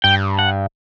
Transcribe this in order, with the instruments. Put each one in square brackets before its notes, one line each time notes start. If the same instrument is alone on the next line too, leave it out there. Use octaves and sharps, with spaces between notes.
[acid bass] G2 [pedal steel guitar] G5
[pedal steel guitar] F#5